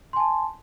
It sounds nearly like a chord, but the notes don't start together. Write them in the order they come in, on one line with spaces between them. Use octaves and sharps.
C6 G#5 A5